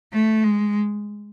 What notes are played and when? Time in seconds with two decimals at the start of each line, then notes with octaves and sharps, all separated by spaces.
0.13 A3
0.44 G#3